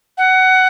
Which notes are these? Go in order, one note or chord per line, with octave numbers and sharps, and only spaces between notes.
F#5